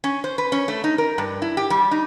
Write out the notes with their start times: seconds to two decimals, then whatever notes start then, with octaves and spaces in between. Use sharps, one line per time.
0.04 C#4
0.24 C5
0.38 B4
0.52 C#4
0.68 A3
0.84 D#4
0.98 A#4
1.18 G2
1.42 E4
1.57 G4
1.70 G3
1.91 D#4